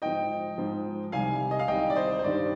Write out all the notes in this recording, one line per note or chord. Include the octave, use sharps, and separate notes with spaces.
G#2 F3 D#5 G5
G#2 F3
C2 C3 D#3 G3 F5 G#5
D#5
F5
C2 C3 D#3 G3 D#5 G5
D5
C5 D#5
C5
G2 D#3 G3 D5